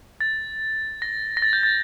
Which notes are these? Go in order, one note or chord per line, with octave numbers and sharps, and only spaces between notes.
A6
A#6
A#6
A6
G6
A6